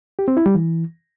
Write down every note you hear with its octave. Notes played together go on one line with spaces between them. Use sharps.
G4
C4
E4
G3
E3